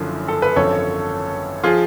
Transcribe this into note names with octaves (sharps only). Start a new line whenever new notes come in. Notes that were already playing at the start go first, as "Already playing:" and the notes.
Already playing: F#1 F#2 D3 F3
A4
B4
G#1 F#2 D3 F3 A4 C#5
F3 F4 G#4